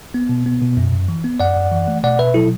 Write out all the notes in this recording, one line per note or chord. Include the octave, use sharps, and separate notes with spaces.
B3
B2
B3
B2
F#2
F#2
E3
B3
F#2 D5 F#5
F#2
E3
A3
B2 D5 F#5
B2 B4 E5
F#3 E4 A4